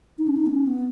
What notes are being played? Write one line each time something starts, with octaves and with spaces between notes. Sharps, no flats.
D#4
C#4
D#4
B3
C#4
B3